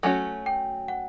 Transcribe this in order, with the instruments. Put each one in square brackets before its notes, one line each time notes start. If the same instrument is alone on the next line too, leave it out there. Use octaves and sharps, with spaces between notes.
[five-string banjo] F#3 A3 C#4 F#4 [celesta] G#5
[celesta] G5
F#5